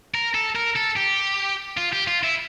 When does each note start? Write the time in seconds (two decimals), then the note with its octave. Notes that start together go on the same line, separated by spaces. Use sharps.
0.14 A#4
0.34 A4
0.55 A#4
0.76 A4
0.96 G4
1.77 F4
1.93 G4
2.07 F4
2.24 E4